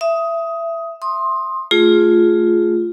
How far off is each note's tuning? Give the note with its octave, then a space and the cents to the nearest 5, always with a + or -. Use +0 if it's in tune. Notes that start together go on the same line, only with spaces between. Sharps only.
E5 +15 D#6 +15
C6 +20 D#6 +0
A3 +0 F4 +0 G#4 +0